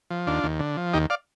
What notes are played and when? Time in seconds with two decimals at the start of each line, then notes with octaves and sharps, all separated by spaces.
0.10 F3
0.27 D#2 D4 F4
0.44 D#2
0.60 D3
0.77 F3
0.93 D#2 D#4 G4
1.10 D5 F5